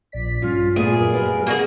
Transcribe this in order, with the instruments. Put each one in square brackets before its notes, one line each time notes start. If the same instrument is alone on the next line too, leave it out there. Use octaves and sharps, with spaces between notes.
[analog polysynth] A#1 D5 B6
[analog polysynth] G2 [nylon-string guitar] C#4 [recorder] F4
[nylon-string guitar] A#2 B3 E4 [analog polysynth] A3 D#6 [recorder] F4 [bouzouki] G#4
[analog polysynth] F#2 [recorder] A#4
[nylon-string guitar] F#3 F4 B4 [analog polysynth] G3
[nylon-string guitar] C3 E3 [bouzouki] A#3 F#4 G#4